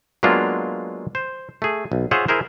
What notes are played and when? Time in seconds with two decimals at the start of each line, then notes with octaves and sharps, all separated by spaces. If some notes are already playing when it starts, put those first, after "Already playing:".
0.23 F#3 G#3 A#3 B3 D4 F4
1.15 C5
1.62 A3 G#4
1.92 B1
2.11 F4 G#4 C5 C#5 E5 F#5
2.28 E4 G#4 A#4 C5